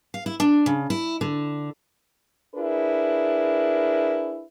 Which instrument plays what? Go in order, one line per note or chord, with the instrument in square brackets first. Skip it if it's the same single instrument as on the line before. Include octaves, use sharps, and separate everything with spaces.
[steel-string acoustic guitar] F5
E4
D4
C#3
E4
D3
[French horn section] D4 E4 G#4 A#4 B4